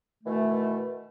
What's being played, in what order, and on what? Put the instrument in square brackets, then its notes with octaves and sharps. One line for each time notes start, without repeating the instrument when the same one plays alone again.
[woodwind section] B2 D#3 E3 A3